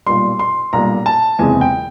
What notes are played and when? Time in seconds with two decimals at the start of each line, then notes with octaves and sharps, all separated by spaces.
0.06 B1 A#2 G3 C6
0.39 C6
0.73 B1 A#2 G3 A#5
1.06 A5
1.39 F#1 E2 C3 E3 G#3 G#5
1.61 G5